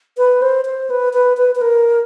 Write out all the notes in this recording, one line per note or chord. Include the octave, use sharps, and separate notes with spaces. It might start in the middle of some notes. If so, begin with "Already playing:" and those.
B4
C5
C5
B4
B4
B4
B4
A#4